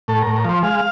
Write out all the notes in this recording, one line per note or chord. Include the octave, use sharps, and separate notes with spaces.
A2 A4
A#4
A2
A#4
F3 C5
G#3 F5